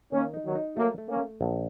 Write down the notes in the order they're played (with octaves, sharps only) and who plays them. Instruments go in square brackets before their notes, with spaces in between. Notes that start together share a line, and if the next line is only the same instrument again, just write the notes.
[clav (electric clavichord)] D#3 [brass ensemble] A#3 C#4
[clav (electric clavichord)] D#4
[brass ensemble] D#3 F#3
[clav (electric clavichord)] D#4
[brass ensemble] F#3 A#3 [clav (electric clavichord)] A3
[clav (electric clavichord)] A3
[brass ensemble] A#3 C#4
[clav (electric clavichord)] A3
A#1